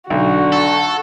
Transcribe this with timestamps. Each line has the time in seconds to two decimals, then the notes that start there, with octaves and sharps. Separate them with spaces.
0.10 B1 D3 F#4
0.52 A4